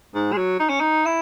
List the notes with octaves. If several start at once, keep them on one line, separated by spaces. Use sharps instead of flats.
G#2
G#3
F#3
D#4
C#4
D#4
E4